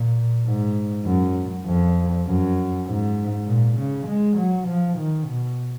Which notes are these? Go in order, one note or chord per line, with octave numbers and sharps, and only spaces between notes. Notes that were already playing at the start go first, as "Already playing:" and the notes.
Already playing: A#2
G#2
F#2
F2
F#2
G#2
A#2
C#3
G#3
F#3
F3
D#3
B2